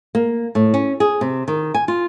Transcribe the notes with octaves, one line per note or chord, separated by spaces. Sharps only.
A#3
A2
C#4
G#4
C3
D#3
G#5
F4